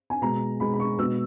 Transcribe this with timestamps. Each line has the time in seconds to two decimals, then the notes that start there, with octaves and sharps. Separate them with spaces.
0.10 G#5
0.21 B2 G#3 A#5
0.60 B2 G#3 B5
0.74 B5
0.80 C#6
0.98 B2 G#3 E6